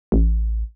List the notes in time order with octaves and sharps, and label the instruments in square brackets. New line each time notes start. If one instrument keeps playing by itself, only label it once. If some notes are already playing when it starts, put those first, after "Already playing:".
[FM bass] A1